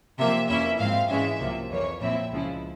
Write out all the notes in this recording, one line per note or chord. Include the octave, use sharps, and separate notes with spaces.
C3 F3 A#3 E5
F2 E3 A#3 C#4 E4 E5
G#2 F3 C4 F5
G#2 E3 G#3 C#4 E5
C2 C3 F3 A#3
F2 E3 A#3 C#5
A#2 F3 C4 E4 E5
C#2 C#3 F3 G#3 E4